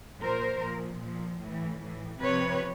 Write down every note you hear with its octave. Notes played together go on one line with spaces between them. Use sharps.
A#2 F3 A#4 C5
A#2 F3
A#2 F3
A2 E3
A2 E3
C3 F3 B4 C#5